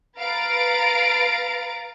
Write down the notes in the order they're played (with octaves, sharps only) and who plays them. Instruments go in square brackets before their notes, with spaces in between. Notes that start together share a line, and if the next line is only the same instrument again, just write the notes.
[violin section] B4 F5 A#5 A6 D7